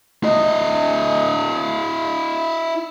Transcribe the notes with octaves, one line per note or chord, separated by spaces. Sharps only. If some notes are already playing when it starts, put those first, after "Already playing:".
E4 D#5